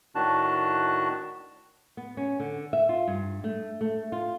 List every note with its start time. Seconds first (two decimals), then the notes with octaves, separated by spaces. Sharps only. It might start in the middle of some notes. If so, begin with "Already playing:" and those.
0.15 A2 D#3 D4 F#4 A5 F#6
1.97 B3
2.17 C#4
2.40 D3
2.73 E5
2.89 F4
3.08 G2
3.44 A3
3.81 A3
4.12 F4